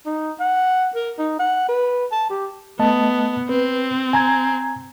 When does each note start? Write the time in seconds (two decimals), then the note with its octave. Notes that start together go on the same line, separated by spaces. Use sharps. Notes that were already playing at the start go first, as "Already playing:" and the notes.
0.06 D#4
0.40 F#5
0.95 A#4
1.19 D#4
1.39 F#5
1.69 B4
2.12 A5
2.30 G4
2.79 A3 B3 D#5 A5
3.49 C4 B4
4.13 G#5 A#5 G#6